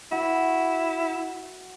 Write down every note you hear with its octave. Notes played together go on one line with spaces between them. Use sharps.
E4 F#4